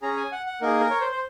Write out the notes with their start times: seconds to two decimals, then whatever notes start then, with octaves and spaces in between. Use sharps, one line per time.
0.02 C#4 G#4 A#5
0.17 G#5
0.32 F#5
0.46 F#5
0.61 A#3 D#4 G#4 A#4
0.81 A#4
0.90 C#5
1.01 C5
1.12 C5